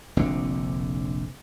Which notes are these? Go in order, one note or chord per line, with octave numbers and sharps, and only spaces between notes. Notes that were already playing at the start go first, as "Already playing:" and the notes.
F1 A#1 D3 C4